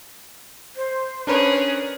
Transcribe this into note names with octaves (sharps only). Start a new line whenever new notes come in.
C5
C#4 D4 G#4 A#4 B4